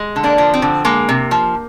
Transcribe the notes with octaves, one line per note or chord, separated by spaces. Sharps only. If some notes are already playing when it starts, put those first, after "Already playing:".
Already playing: G#3
D3
A#3 D4
F3
C4
D3
G#3 A#3
C3
F3